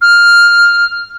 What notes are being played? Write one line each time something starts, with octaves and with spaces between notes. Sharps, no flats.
F6